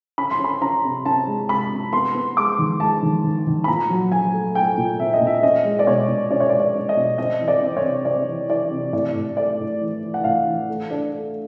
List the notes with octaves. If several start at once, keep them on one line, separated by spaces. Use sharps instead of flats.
C#4 B5
C6
C#4
B5
C#4 A#5
C3
C#4 A5
G#3
C3 B5
C3
B3 C6
B3
G#3 D6
D#3
G#3 A5
D#3
D#3
D#3
B5
A#2 A#5
F#3
F#3 G#5
A3
A3 G5
A#2
C4 E5
D#5
A#2
E5
C#4 D#5
G#3
D5
B2 C#5
B2
C#4 D5
C#5
D5
G#3
D5
C#4
D#5
B2
C4 D#5
E3
D5
C4
C#5
C3
C4 D5
E3
E3 D5
C3
A2 D5
A2
A3 D5
A2
E3
E3
F#5
A2 F5
E3
A3
D4
A3